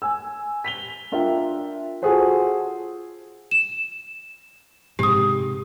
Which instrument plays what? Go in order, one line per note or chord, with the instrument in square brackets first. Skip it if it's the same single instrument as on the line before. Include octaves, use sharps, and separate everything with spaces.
[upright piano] G#5 E6
B6 F7 G7
D4 F4 A#4 E5 G5
F4 F#4 G#4 A4 C5 F#5
[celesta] E7
[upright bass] G#2 C3 [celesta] G4 D#6